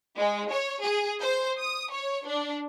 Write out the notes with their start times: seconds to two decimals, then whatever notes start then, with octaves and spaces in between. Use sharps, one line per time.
0.17 G#3
0.50 C#5
0.81 G#4
1.20 C5
1.59 D#6
1.92 C#5
2.26 D4